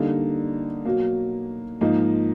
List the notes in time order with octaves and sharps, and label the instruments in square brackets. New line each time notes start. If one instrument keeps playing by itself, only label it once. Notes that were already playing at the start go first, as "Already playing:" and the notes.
Already playing: [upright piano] D3 G3 A#3 D#4
B2 F#3 A#3
G#2 F3 A#3 D#4